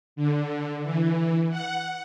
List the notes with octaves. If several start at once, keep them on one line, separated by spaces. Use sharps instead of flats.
D3
E3
F#5